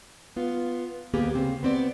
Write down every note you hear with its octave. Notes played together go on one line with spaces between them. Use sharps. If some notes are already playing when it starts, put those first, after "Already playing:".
B3 F4
D2 A#3 B3 G4 G#4
C#3 C4
B3 C4 D5